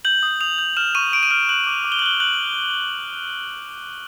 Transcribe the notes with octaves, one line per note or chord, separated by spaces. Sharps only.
G6 F#7
D#6
D#6 F7
G6
F6 E7
C#6 D#7
C#6 D7
D#7
F6 D7
F#6 F#7
D6
D6
G7
F#7
F#6 G7
F#6 F#7